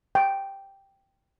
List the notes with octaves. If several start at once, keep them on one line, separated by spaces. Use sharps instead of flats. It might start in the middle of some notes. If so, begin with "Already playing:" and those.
G5